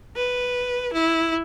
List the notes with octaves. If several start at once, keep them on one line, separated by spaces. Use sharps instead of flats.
B4
E4